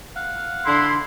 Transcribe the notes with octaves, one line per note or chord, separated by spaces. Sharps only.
F5 F#5
D3 E4 B5 C6